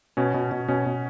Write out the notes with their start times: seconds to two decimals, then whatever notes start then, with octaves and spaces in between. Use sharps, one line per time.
0.17 B2 C#4
0.34 B2
0.52 B2
0.68 B2 C#4
0.86 B2